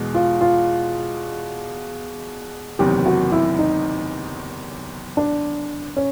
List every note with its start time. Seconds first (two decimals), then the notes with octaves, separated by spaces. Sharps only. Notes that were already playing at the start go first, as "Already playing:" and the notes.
Already playing: E2 B2 G#3
0.14 F4
0.41 F4
2.79 F#1 E2 C3 D#3 F#3 G4
3.06 F#4
3.32 E4
3.59 D#4
5.17 D4
5.96 C#4